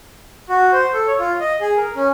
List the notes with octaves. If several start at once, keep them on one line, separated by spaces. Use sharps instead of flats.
F#4
C5
A4
C#5
F4
D#5
G#4
A#4
C#4